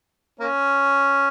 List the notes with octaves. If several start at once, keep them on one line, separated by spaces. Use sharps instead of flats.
A#3 C#4